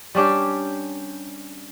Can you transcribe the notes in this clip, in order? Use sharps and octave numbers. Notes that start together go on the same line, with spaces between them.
G3 C#4 D4 G4